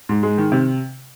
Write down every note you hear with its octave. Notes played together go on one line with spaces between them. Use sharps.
G#2
G#3
D#3
C3